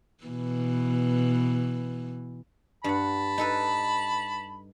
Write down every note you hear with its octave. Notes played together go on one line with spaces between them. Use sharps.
B2 E3
G2 F#5 A5 B5
D#4 A4 B4